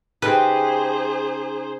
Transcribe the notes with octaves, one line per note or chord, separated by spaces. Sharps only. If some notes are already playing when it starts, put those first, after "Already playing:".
C#3 D#4 G4 G#4 B4 C5 G5 C6